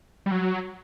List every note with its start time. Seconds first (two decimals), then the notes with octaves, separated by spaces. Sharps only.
0.26 G3
0.31 F#3